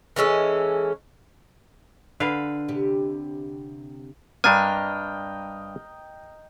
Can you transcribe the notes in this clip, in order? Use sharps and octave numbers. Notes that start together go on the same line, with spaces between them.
E3 G#3 C#4 A4
D3 B4 F5
C3 G4
G2 D4 D#5 G5 G#5 A#5 F6